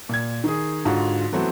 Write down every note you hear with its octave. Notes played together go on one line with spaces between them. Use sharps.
A#2 G#6
D#3 G#4
G#2 D3 F4 F#4
E3 F#3 A3 B3 C4 F#4